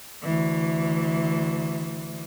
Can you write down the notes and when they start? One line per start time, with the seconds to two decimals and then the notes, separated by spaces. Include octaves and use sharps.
0.23 D2 E3